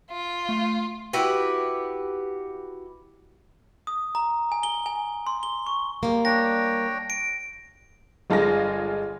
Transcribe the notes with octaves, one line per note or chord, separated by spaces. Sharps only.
F4
A3
E4 F#4 G4 B4
D#6
A#5
G#5
G7
G#5
C6
G7
C#6
G3 A#3
D4 C#5 G5 A#6
D7
G1 G#3 F4 A4 G#5 A#6